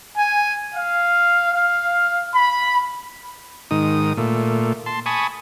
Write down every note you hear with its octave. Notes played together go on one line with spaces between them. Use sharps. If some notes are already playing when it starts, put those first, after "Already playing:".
G#5
F5
F5
B5
G#2 D#3 D#6
A#2 A3
A5 C6
G#5 A5 B5 C#6 D#6